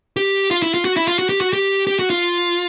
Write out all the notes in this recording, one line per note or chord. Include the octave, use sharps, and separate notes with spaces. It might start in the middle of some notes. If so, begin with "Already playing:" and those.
G4
F4
E4
F4
F#4
E4
F4
F#4
G4
F#4
G4
G4
F#4
F4